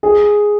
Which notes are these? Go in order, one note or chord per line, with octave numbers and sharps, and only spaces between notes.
G#4